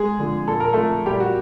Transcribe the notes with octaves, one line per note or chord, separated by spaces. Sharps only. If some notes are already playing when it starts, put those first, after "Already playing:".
Already playing: G#3 G#4
D3 F3
A#2 A4
A#4
F3 A3 A4
A#2 G3 G4
F#4